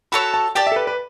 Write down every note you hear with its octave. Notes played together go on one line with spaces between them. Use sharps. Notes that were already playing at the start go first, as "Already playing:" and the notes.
F#4 A4 C#5 B5
A5
G4 D5 G5 A5
E5
A4
B4
B4